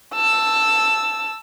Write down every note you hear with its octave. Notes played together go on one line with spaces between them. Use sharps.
A5 E6